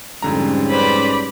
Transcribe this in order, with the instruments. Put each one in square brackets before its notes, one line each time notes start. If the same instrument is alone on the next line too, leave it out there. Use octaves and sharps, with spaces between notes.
[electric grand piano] F2 D3 A#5 [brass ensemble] G#2 G3 C#4
[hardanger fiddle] B4 C5 [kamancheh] D5 B5